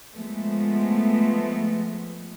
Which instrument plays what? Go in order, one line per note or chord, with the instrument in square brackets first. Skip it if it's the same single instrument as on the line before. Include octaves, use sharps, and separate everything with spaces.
[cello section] F3 G#3 A3 B3